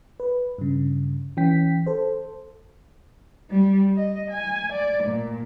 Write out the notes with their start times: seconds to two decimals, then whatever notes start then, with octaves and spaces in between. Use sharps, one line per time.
0.20 B4
0.58 G2 C#3
1.37 E3 C#4 G5 B6
1.86 A4 C5
3.49 G3
3.96 D#5
4.31 G#5
4.72 D5
5.03 A#2